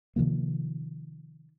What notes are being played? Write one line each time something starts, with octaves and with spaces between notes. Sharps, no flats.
C3 D#3 F3 A#3